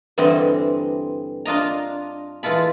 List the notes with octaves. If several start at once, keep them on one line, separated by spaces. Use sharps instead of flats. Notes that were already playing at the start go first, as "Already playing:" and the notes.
G2 D3 E3 C4 E4 D#5
D4 F4 D#5 A#5
E3 G#3 F4 A4 B5